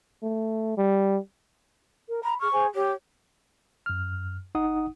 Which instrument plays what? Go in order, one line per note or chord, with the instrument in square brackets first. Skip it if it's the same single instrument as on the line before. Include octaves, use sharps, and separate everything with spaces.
[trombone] A3
G3
[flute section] A#4
[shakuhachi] A#5 [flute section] B5
[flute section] G#4 F6 [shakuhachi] C#6
[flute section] G#4 C5 G#5
[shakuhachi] G4 [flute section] C#5
[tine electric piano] F#2 F6
G1 D#4 F#5 D#6